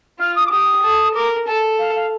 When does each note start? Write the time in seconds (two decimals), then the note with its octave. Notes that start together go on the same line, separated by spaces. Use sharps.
0.19 F4 F6
0.36 D#6
0.46 D6
0.51 G4 D#6
0.83 A4
1.14 A#4 D6
1.46 A4 A5
1.79 F5
1.95 F5